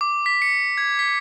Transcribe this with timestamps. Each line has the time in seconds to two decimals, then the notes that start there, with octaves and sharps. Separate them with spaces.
0.01 D6
0.26 B6
0.42 C#7
0.78 G#6
0.99 B6